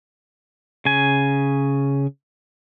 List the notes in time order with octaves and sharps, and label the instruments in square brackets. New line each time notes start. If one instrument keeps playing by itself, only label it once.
[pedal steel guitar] C#3 G#5